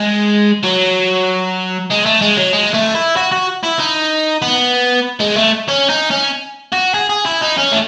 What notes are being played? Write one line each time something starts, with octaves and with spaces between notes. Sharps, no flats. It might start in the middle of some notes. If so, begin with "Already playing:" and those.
Already playing: G#3
F#3
G#3
A3
G#3
F#3
G#3
A3
E4
F#4
F#4
E4
D#4
B3
G#3
A3
C#4
D#4
C#4
F#4
G#4
G#4
E4
D#4
C#4
A3